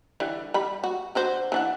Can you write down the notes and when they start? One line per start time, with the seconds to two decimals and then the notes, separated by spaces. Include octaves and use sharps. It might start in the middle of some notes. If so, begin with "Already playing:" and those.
0.20 D3 E3 G3
0.54 G3 B5
0.84 F#4
1.15 D3 F#4 C5
1.52 E3 D4 F#5